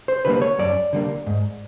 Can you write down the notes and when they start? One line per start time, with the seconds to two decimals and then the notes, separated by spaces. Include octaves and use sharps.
0.08 C5
0.25 D3 G3 A#3 B4
0.42 C#5
0.59 F#2 D5
0.93 D3 G3 A#3
1.26 G#2